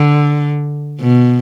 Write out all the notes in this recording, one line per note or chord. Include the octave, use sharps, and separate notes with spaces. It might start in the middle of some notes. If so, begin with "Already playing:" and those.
Already playing: D3
B2